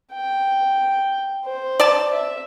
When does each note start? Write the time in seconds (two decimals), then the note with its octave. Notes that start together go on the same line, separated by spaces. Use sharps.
0.13 G5
1.46 C5
1.80 D5 A5
2.12 E5